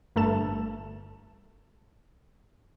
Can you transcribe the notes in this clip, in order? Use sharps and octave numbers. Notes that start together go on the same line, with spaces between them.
G1 A3 A4 A5 E7